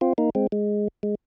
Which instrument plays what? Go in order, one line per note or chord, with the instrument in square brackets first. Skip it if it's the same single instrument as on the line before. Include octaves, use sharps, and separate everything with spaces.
[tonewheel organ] C4 F4
A#3 D#4
G#3 C4
G#3
G#3